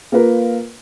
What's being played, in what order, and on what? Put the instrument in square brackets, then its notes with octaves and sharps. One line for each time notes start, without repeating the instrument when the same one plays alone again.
[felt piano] A#3 F4 A#4 B4